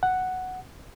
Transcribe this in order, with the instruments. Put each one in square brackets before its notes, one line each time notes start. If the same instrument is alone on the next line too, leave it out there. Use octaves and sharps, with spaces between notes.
[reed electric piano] F#5